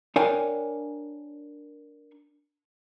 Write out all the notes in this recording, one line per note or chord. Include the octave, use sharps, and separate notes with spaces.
D4 A#4 C#5 F5 G5 G#5